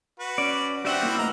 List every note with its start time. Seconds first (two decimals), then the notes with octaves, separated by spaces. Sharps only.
0.19 F#4 B4
0.38 C#4 D5
0.85 G3 C4 D4 F#4 G4 E5 F#5
1.02 A#3 E4
1.18 A3 B4 D#5 A#5